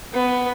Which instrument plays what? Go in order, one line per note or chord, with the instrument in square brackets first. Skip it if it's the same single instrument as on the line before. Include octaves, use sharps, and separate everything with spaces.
[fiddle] B3